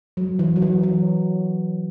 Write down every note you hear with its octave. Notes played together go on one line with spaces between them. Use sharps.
F#3
E3
F#3
E3
F#3